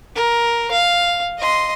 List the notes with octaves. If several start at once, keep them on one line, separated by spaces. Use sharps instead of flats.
A#4
F5
D#5 C6